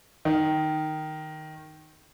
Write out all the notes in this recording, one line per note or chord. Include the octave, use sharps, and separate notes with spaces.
D#3